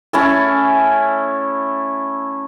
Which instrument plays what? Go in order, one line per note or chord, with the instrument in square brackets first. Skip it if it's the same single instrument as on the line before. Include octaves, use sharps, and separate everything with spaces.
[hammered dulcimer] A3 C#4 E4 A4